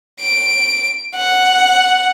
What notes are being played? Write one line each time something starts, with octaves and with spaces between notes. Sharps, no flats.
D7
F#5